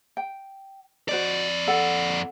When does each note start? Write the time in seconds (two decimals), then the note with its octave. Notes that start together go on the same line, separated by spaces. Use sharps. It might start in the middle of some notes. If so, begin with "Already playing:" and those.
0.17 G5
1.09 F2 F#4 C5 D5 D#5
1.67 A4 F#5